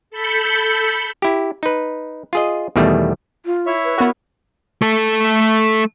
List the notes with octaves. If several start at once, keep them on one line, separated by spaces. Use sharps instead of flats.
A4 B5 G6 C#7
E4 G4
D#4 B4
F4 G#4 D#5
E2 B2 D#3 G3 A3
F4
E4 C#5 E5
B4
B3 F#4 A#4
A3 A4